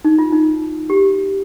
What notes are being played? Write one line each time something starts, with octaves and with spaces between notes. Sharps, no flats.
D#4
F4
D#4
G4